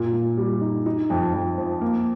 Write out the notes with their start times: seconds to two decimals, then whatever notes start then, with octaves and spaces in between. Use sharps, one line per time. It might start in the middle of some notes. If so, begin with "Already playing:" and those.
Already playing: A#2
0.13 A#2
0.37 G3
0.61 D#4
0.86 D#4
1.10 F2
1.34 F2
1.58 F3
1.81 A#3